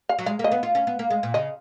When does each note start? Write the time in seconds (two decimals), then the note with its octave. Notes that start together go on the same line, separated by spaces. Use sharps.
0.09 F5
0.19 F#3
0.26 G#3 F5
0.39 A#3
0.44 D#5
0.52 B3
0.63 F4
0.75 C#4
0.87 B3
0.99 A#3
1.10 G#3
1.23 A#2
1.34 C#3 D#5